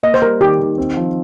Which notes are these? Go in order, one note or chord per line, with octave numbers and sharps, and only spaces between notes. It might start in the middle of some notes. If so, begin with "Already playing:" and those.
A#3 D#5
C5
G3 A#4
D#3 G4
D#3
C4
F3